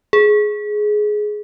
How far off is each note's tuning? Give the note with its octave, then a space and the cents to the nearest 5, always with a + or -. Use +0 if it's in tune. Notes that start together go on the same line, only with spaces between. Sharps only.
G#4 +15